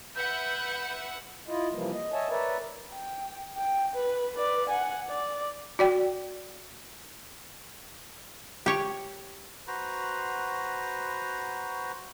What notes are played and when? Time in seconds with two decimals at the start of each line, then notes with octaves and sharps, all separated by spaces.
0.16 B4 E5 F#5 G6
1.48 E4 F4 D#5
1.72 C3 E3 F3 G3 A#3
1.93 D#5
2.13 C#5 D#5 E5 G#5 A5
2.29 A#4 B4 C#5 D5 E5
2.92 G5
3.57 G5
3.95 B4
4.37 B4 D5
4.69 F#5 G#5
5.09 D5
5.79 F#4 D5 G5
8.66 G4 C#5
9.67 F#4 B4 C5 A#5